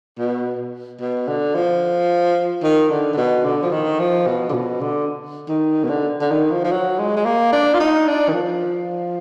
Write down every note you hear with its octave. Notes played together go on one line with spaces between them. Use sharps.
B2
B2
D3
F3
D#3
D3
D3
B2
D3
F3
D#3
F3
B2
D3
B2
D3
D#3
B2
D3
D3
D#3
F3
F3
F#3
G#3
G#3
A#3
D4
F4
D#4
D4
D#3
F3